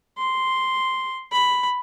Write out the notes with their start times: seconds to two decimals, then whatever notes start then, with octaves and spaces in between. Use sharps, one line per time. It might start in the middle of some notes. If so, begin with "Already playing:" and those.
0.18 C6
1.32 B5